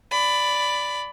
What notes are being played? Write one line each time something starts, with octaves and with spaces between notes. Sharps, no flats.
D5 B5